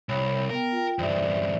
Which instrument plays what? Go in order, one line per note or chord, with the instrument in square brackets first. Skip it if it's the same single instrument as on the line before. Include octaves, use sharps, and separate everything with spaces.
[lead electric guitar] C2 [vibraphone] C#5 B5
[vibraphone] B3 G5 [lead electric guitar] A#4
[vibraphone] F4 G5
[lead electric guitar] E2 G2 [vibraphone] C5 D5 E5